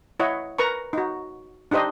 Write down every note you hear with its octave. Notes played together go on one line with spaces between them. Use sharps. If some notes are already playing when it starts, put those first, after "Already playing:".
E4 C#5 D#5 F#5
A#4 B4 A#5 C#6
D#4 F#4
D4 D#4 G4 C5 D#5